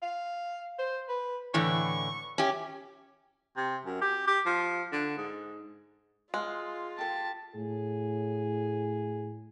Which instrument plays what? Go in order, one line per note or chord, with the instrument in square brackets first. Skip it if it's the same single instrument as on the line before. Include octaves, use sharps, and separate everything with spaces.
[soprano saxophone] F5
C5
B4
[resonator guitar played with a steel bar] A2 D3 E3 [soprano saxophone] C#6
[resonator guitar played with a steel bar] C#4 G4 [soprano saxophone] E5
[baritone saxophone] C3
F#2
G4
G4
F3
D3
G#2
[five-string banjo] G#3 [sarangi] F4 [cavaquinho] F5
[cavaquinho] G4 A4 [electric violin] A5
[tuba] A2 [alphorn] G#4